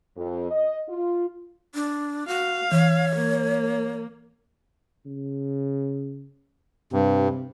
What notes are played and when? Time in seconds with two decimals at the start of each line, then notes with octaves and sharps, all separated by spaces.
0.17 F2
0.51 D#5
0.88 F4
1.74 D4
2.28 F#4 F5
2.72 E3 C#5
3.16 A#3
5.06 C#3
6.93 G2 C3